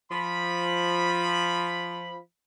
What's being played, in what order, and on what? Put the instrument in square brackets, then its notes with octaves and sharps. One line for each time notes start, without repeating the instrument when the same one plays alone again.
[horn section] F3 B5